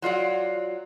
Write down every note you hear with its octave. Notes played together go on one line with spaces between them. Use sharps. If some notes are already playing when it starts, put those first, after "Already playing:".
F#3 F4 D5 F#5